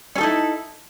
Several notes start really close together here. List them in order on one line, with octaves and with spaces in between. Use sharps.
C#4 A4 D#4 E4